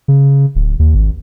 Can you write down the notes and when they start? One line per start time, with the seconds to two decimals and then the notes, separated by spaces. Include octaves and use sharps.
0.08 C#3
0.55 D1
0.79 D#2
0.95 G#1